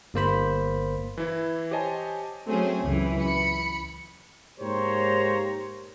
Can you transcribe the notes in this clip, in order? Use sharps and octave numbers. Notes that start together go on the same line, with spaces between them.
G1 A#3 C5 B5
E3 E4
G4 C5 C#5 D#5 G#5 A5
F#3 A3 C4 C#4 G#4
C#2 F#2 E3
B5 C#7
G#2 A#3 G4 C5 C#5 A#5